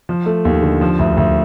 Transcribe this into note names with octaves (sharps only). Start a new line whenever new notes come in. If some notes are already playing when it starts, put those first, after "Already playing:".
F3
A3
D#2
D3
F3
D2
D2